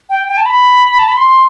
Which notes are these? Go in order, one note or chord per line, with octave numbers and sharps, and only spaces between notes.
G5
G5
A5
B5
A5
B5
C6